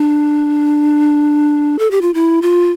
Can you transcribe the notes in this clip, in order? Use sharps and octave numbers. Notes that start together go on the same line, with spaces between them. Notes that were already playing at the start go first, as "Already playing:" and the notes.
Already playing: D4
A4
G4
F4
E4
F4